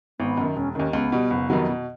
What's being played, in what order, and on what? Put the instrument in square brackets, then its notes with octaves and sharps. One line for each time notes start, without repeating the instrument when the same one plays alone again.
[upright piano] G#1 [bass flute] B3
[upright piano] F#2 D#3
[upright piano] E1 [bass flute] C#4
[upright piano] D#2 D#3 [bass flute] C#4
[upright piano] C#2 [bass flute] B3
[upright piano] B2 G3
F#1
F2 C3 D#3 F#3
B2